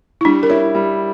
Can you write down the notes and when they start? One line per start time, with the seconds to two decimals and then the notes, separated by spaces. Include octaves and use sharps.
0.21 E4
0.25 G3 D4
0.43 A#4
0.50 E4 C#5
0.75 G3